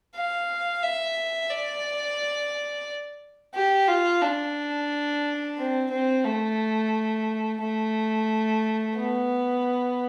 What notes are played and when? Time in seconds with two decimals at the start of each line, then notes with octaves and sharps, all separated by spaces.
0.15 F5
0.83 E5
1.50 D5
3.54 G4
3.88 F4
4.22 D4
5.58 C4
5.91 C4
6.25 A3
7.61 A3
8.96 B3